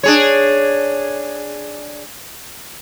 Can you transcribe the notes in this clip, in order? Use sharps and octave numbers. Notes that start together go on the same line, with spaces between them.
D4 G#4 C#5